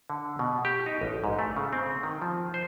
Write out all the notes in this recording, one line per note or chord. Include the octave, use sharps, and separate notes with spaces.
D3
B2
G4
D#4
A1
G#2
A3
C#3
C4
D#3
F3
C5